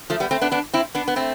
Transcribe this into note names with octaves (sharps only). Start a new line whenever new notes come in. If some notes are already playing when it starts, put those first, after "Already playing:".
F3 A3
G3 B3
A3 C4
B3 D4
B3 D4
C4 E4
B3 D4
B3
A3 C4